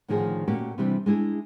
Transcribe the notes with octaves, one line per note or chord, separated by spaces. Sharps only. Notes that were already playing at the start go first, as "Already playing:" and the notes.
A2 D3 D#3 F3 G#4
A#2 A3 A#3 C#4 F#4 G4
C3 E3 G3 C4 D4
G#3 D4 E4 G#4